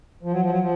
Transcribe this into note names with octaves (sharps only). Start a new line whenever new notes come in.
F3
F#3
F3
F#3
F3